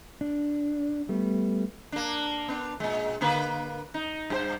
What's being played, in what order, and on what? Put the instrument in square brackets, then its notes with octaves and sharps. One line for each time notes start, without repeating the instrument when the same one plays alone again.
[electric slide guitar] D4
G3 A3 B3
[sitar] A#3 D4
B3 D4
A#2 G#3
D3 A#3 B4
D#4
G2 G4 C5